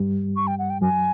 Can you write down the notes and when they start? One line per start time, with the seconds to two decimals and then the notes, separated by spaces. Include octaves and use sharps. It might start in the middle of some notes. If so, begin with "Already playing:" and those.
Already playing: G2 G3
0.36 C#6
0.47 G5
0.59 F#5
0.70 G5
0.81 F#2 F#3 G#5